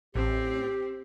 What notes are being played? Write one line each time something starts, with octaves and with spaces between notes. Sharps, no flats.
A1 C4 G4